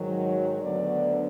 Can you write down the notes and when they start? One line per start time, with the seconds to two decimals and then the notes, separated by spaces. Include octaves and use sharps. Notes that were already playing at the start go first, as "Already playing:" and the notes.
Already playing: G#2 D#3 F#3
0.62 D2 D3 F#3 B3 D5